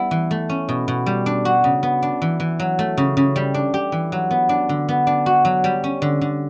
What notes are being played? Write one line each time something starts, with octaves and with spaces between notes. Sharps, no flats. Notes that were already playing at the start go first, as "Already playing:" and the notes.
Already playing: G3 B3 E4
E3
A3
C#4
B2
B2
G3
D4
F#4
C#3
B3
D4
E3
E3
F#3
A3
C#3
C#3
G3
D4
G4
E3
F#3
B3
D4
D3
B3
D4
F#4
F#3
G3
C#4
D3
D3